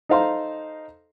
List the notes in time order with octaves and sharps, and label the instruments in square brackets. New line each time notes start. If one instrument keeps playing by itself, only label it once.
[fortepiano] D#4 A4 C5 F5 A#5 C6